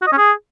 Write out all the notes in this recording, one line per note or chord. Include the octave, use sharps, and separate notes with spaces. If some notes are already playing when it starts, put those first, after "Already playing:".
F#4
D#5
C#4
G#4